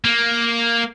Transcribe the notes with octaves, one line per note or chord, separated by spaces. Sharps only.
A#3